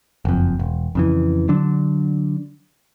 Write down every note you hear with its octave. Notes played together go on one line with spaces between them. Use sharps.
F#1 F2
E1
F2 C#3 E3
D3 F#3 D4